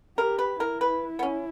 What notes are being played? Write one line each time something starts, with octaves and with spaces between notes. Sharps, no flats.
G4 A#4
B4
E4 A#4
B4
B3
C#4